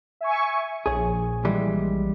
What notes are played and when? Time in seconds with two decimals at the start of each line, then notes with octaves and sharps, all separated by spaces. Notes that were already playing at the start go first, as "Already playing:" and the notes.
0.21 E5 G#5 C#6
0.86 A#1 G#4 C#5
1.45 E3 G3 G#3